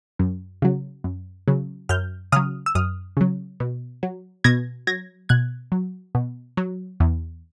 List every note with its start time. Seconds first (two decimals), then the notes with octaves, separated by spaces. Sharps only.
0.19 F#2
0.62 C#3 F#3
1.04 F#2
1.48 C#3 F#3
1.89 F#2 F6 G6
2.32 C#3 F#3 D#6 F6
2.66 E6
2.75 F#2 D#6 F6
3.17 C#3 F#3
3.60 B2
4.03 F#3
4.44 B2 G#6 A#6
4.87 F#3 G#6 A#6
5.29 B2 F#6 G#6
5.72 F#3
6.15 B2
6.57 F#3
7.00 E2